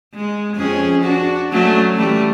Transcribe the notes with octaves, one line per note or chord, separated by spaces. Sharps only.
G#3
F2 C#4 G#4
D4 F#4
F#3 A3 C#4
E3 G3 A3